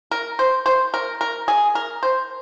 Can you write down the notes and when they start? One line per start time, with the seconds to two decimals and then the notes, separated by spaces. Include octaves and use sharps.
0.11 A#4
0.39 C5
0.66 C5
0.94 A#4
1.21 A#4
1.48 G#4
1.75 A#4
2.03 C5